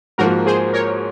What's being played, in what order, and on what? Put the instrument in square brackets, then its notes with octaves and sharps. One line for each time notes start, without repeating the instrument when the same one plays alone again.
[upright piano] G#2 F3 A#3 [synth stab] F#4 A#4
[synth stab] G#4 C5
A#4 C#5